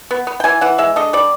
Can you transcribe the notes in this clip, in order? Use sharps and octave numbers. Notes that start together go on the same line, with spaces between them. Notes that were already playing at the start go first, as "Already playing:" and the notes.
B3
B3
G5
E3 G#5
E3 F#5
G#3 E5
D3 D#5
G3 D5